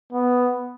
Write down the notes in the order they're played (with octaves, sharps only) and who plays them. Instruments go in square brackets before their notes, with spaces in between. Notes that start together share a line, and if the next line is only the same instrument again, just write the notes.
[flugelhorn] B3